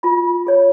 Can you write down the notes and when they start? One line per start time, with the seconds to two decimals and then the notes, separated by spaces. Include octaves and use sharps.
0.03 F4 B5
0.47 G#4 C#5